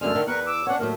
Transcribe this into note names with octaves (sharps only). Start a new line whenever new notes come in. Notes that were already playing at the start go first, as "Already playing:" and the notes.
F#2 D3 G#3 A3 F6
D3 D#3
E2 A#4 B4 C#6 F#6
D6 E6
C#4 D4 C#5 F#5
D#2 A2 F#3 A3 A#4